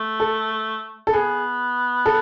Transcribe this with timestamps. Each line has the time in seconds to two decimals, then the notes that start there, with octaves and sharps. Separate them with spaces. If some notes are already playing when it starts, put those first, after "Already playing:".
Already playing: A3
0.20 A4
1.07 A4
1.13 B3 G#4
2.06 A4